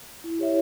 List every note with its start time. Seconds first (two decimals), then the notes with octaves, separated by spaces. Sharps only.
0.24 E4
0.39 G4 C#5 E5